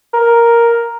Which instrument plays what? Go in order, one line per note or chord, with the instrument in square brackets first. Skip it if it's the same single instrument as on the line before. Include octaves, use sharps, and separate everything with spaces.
[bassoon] A#4